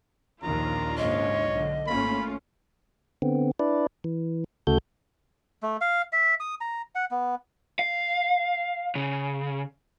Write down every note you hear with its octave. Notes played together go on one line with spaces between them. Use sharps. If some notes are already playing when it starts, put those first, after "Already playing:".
A#1 D#2 D#3 C#4 D4 F4 A#5
D#2 G#2 C#3 C#5 D#5
B1 D3
G#1 A3 A#3 C#4 F4 B5
D3 B3 C4
D4 E4 B4 D5
E3
D2 C#3 A3 F#4 A4 G6
A3
F5
E5
D#6
A#5
F#5
B3
F5
C#3